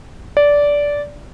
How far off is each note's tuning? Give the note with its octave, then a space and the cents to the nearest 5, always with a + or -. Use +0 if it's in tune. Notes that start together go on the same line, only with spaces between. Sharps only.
D5 -15